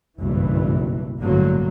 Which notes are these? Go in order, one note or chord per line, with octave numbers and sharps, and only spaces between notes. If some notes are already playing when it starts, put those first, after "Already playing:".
F#1 B1 G2 E3
A1 G2 D3 F#3 A#3